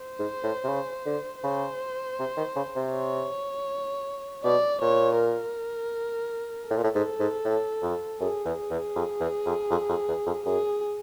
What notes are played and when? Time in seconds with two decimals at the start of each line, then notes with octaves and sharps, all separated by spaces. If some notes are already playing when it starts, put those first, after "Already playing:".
Already playing: C5
0.19 G#2
0.43 A2
0.64 C3
0.69 C#3
1.06 D3
1.43 C#3 C5
2.19 C3
2.37 D#3
2.56 C#3
2.75 C3
2.94 C#5
4.44 B2 D5
4.81 A#2 C#5
5.20 A#4
6.70 A2 A4
6.77 A#2
6.84 A2
6.95 G#2
7.20 G#2
7.45 A2
7.82 F2
8.20 F#2 G#4
8.45 E2
8.58 G#4
8.70 E2
8.96 F2
9.20 E2
9.46 F2
9.70 F2
9.89 F2
10.08 E2
10.26 F2
10.45 F#2 G#4